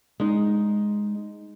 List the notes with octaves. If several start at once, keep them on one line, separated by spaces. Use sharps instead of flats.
G#3 D#4